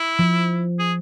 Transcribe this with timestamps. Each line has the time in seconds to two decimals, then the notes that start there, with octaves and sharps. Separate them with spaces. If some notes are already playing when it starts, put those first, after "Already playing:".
Already playing: E4
0.19 F3
0.79 G#4